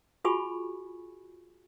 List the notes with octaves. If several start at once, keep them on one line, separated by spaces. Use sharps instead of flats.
F4 F#4 G#4 G#5 B5 C#6